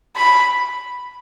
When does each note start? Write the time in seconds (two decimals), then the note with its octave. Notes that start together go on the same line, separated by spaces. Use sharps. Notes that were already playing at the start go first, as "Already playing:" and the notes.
0.16 B5